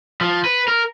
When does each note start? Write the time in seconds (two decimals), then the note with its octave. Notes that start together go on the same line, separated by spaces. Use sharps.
0.21 F3
0.45 B4
0.68 A#4